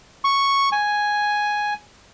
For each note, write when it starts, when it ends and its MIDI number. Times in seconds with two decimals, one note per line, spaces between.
0.24 0.69 85
0.72 1.74 80